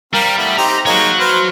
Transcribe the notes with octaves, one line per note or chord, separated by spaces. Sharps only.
G3 C4 A#4 F5
A3 B3 E4
C4 D#4 G4 A#5
G#3 A#3 D#4 F#4 C#5
B4 C5 F6